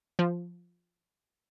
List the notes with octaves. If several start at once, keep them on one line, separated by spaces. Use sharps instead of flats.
F3